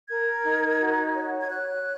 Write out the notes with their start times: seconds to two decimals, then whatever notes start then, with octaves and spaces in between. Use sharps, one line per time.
0.09 A#4 G#6
0.44 D#4
0.79 F#4
1.15 C#5
1.41 G#6
1.50 C#5 F#6